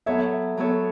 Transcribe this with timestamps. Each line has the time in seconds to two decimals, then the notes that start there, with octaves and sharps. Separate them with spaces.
0.06 F#3 B3 A4 C#5 E5
0.57 F#3 B3 A4 C#5